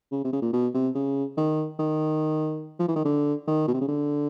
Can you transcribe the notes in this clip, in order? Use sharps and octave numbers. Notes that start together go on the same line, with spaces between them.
C#3
C3
C#3
A#2
B2
C3
C#3
D#3
D#3
F3
E3
D#3
D3
D#3
B2
C3
C#3
D3